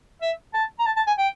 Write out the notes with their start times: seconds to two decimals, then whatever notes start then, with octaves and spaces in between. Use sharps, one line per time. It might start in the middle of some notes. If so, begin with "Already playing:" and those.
0.22 E5
0.54 A5
0.79 A#5
0.86 A5
0.97 A5
1.07 G#5
1.18 G5